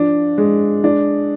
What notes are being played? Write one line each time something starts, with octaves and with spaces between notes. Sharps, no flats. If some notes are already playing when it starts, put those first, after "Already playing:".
Already playing: F3 D4
G#3
D4